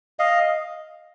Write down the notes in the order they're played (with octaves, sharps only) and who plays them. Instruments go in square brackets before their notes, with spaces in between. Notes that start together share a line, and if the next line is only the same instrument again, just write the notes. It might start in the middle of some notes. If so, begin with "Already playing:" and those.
[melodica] D#5 F5